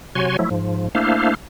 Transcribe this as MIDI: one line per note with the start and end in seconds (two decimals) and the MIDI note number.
0.15 0.37 48
0.15 0.37 54
0.15 0.37 66
0.15 0.37 73
0.15 0.37 80
0.15 0.37 84
0.39 0.49 53
0.39 0.49 54
0.39 0.49 57
0.39 0.49 64
0.50 0.88 44
0.50 0.88 53
0.95 1.34 57
0.95 1.34 58
0.95 1.34 62
0.95 1.34 64
0.95 1.34 72
0.95 1.34 77